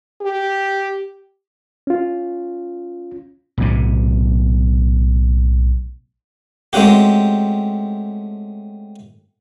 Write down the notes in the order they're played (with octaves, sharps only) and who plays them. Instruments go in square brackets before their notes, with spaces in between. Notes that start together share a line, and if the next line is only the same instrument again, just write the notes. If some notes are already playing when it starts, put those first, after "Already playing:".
[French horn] G4
[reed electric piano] C#4 F4
[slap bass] B1 A2 C3
[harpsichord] G#3 A3 C4 C#4 F#4 G4